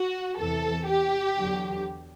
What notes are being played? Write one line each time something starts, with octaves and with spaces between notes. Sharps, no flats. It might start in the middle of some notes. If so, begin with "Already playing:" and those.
Already playing: F#4
E2 C3 E3 A4
G4
E2 D3 F#3